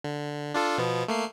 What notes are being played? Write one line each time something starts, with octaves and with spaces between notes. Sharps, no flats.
D3
D4 F4 A4
B2 F3 B3
A3 A#3 C7